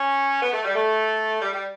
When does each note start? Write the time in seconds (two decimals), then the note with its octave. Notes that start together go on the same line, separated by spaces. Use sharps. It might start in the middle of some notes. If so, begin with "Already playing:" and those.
Already playing: C#4
0.42 B3
0.53 A3
0.64 G3
0.75 A3
1.42 G3
1.53 G3